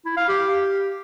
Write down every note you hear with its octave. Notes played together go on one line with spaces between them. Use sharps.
E4
F5
G4